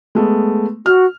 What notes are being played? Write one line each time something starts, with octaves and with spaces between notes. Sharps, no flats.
G#3 A3 B3
F#4 F6